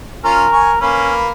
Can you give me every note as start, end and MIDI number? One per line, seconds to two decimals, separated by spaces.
0.24 0.47 61
0.24 0.47 65
0.24 0.80 70
0.52 0.71 80
0.52 0.71 85
0.81 1.31 58
0.81 1.12 61
0.81 1.31 71